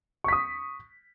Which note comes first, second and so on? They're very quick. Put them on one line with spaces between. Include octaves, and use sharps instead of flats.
C#6 B6 D#6